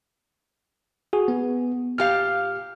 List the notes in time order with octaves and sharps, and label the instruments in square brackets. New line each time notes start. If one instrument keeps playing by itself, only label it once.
[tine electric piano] F#4 G#4
B3
[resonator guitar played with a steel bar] A#2 G4 F5 [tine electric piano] F6